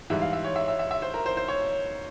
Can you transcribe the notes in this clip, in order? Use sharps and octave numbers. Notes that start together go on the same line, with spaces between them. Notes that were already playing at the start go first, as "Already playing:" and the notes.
G#2 E3 G3 E5
F5
E5
C#5
E5
E5
E5
E5
C5
A#4
C5
C5
C#5